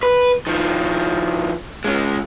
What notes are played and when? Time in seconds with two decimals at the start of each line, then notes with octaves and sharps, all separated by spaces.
0.03 B4
0.47 D#3 F3
1.84 C#3 G#3